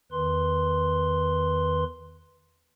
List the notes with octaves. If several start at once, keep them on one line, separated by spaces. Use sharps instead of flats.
E2 D#3 B4 C6